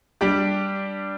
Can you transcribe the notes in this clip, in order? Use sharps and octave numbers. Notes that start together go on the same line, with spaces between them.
G3 D4 G4